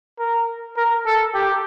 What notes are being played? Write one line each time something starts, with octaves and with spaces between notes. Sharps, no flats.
A#4
A#4
A4
G4